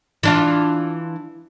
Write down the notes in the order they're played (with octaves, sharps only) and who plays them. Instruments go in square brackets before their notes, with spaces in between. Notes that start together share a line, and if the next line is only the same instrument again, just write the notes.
[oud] E3 D4 F4